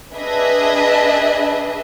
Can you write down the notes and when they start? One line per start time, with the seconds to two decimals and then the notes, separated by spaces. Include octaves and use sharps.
0.14 D4 G#4 B4 D#5 E5